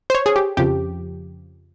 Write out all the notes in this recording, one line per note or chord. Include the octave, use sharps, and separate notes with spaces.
C5
C#5
G#4
G4
F2 C#3 F3 G4